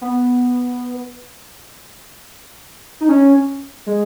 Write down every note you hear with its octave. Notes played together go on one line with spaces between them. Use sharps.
B3
D#4
C#4
G#3